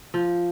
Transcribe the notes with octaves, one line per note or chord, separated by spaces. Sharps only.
F3